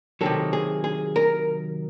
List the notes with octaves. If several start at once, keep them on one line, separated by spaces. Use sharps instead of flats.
C3 D#3 F#3 A4
G#4
G#4
A#4